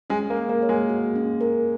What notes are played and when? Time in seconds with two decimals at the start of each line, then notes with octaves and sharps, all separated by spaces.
0.10 G#3 C#4
0.30 A#3
0.37 A#4
0.49 A#3
0.62 C#5
0.69 G#3
0.89 F#4
1.16 C#4
1.41 A#4